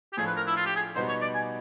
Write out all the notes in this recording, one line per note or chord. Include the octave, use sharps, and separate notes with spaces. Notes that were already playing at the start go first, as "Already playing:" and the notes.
G4
A2 F3 A3 D4 F4 G#4
B4
A#4
E4
F4
G4
G#4
B2 G3 B3 D#4 C5
C#5
D5
G#5